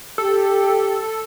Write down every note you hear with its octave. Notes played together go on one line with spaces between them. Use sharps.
G4 A4